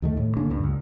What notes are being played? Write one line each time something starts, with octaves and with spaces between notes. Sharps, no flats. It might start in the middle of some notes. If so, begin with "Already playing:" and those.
D#2 D#3 A3
A2
D3 A#3 C#4 D4
C#2 G2 D3
C#2